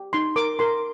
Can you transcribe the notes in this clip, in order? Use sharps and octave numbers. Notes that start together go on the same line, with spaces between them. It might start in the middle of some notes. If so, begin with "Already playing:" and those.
Already playing: G4
D#4 C6
A#4 D6
A#4 C6